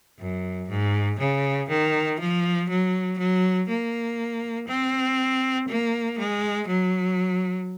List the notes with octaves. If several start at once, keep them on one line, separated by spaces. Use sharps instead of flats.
F#2
G#2
C#3
D#3
F3
F#3
F#3
A#3
C4
A#3
G#3
F#3